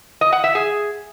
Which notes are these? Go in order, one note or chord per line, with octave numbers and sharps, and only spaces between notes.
D#5
F#5
E5
G#4